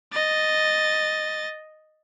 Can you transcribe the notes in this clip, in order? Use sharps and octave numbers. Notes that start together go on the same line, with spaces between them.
D#5 A6